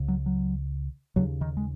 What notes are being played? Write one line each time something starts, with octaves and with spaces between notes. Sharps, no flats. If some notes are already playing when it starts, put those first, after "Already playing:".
Already playing: C#2 C#3
F#3
F#3
D#2 C#3 F#3
D#3
G#3